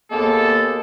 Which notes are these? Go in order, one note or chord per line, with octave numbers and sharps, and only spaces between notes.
D#2 G#3 A#3 B3 A4